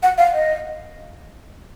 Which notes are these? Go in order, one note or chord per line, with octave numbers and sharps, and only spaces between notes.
F#5
F5
D#5